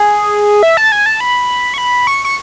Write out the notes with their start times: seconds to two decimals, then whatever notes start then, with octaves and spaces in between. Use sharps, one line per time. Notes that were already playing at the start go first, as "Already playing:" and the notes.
Already playing: G#4
0.63 E5
0.77 A5
0.92 G#5
1.06 A5
1.20 B5
1.74 C#6
1.78 B5
2.07 C#6
2.25 C#6